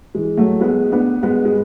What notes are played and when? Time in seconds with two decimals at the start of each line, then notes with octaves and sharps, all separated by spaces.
0.15 E3 G#3
0.37 F#3 A3
0.61 G#3 B3
0.92 B3 D4
1.23 G#3 B3
1.45 G#3